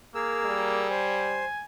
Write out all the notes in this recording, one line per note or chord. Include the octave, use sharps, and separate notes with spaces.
A#3 G#4 A#4 E6
G3
C5 G#5